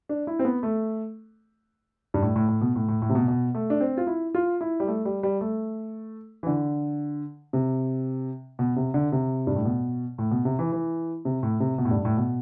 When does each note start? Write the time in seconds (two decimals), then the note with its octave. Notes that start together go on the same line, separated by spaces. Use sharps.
0.09 D4
0.27 E4
0.39 C4
0.45 B3
0.63 A3
2.14 G2
2.22 A2
2.36 A2
2.48 A2
2.61 B2
2.75 A2
2.88 A2
3.02 A2
3.09 C3
3.15 B2
3.28 B2
3.55 A3
3.70 D4
3.81 C4
3.97 F4
4.07 E4
4.35 F4
4.61 E4
4.80 G3
4.88 A3
5.05 G3
5.23 G3
5.41 A3
6.43 E3
6.47 D3
7.53 C3
8.59 B2
8.76 C3
8.94 D3
9.12 C3
9.47 G2
9.56 A2
9.65 B2
10.18 A2
10.31 B2
10.45 C3
10.59 E3
10.72 E3
11.25 C3
11.43 A2
11.60 C3
11.78 B2
11.85 A2
11.91 G2
12.05 A2
12.17 B2